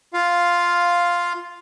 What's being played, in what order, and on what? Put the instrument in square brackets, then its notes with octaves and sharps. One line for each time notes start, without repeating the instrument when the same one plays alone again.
[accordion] F4 F5